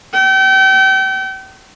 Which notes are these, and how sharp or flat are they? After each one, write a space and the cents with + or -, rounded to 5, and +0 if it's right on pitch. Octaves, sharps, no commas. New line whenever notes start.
G5 -35